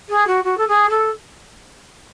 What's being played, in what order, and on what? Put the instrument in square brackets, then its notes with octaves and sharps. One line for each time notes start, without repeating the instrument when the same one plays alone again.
[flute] G#4
F#4
F#4
A4
G#4
A4